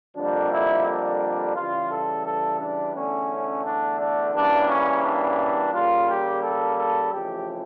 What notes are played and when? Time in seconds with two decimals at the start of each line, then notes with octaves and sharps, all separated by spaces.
0.16 F2 D3 G3 A#3 D4
0.51 E4
0.86 D4
1.55 C#3 E3 G3 F4
1.90 A4
2.25 A4
2.60 D4
2.95 E2 D3 A3 C#4
3.65 D4
3.99 D4
4.34 C#3 E3 G3 A#3 D4
4.69 C#4
5.04 D4
5.73 C#3 G3 A#3 F4
6.08 G4
6.42 A4
6.78 A4
7.12 F2 C#3 E3 A3 G4